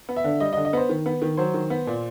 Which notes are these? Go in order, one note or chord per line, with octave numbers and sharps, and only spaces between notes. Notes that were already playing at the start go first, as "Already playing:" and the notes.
B3
E5
D3
G3 D#5
D#5
D3
D#5
B3 C5
D#3
B3
D#3
F#3 C5
D#3
B3
A#2